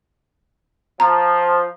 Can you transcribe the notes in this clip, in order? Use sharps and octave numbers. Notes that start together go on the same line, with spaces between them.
F3 A#5